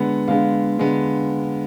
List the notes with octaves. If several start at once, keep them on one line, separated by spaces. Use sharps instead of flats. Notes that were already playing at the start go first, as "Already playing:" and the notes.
Already playing: D3 G#3 B3 F#5
D3 G#3 B3 F5
D3 G#3 B3